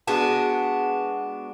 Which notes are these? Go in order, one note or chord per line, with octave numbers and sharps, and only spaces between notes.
G#3 B3 D4 F#4